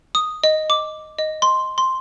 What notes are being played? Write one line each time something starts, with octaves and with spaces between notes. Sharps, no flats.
D#6
D#5
D6
D#5
C6
C6